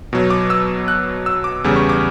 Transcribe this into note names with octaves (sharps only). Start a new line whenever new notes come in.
B2 F#3
D6
E6
F#6
E6
D6
E2 C#3 G3
C#6
D6